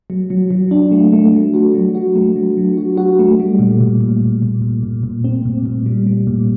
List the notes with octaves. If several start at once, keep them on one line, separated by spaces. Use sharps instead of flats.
F#3
F#3
F#3
D4
A3
A3
F#3
F#4
F#3
F#4
A3
F#3
F#3
F#4
F#4
A3
G3
A#2
A#2
A#2
A#2
A#2
A#2
A#2
A#2
C4
A#2
A#2
G3
G3
A#2